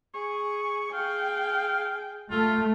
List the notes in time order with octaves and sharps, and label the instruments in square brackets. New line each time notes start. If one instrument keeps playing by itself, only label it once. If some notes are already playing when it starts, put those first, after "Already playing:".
[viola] G#4 [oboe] C#6
[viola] G#4 G5 [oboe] F5
[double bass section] A3 [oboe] F4